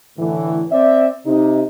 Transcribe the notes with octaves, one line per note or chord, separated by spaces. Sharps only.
A2 D3 E3
C4 D5 E5
C3 D#4